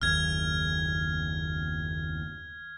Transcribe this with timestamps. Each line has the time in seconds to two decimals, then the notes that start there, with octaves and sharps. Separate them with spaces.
0.02 F#1 D#2 F6 G#6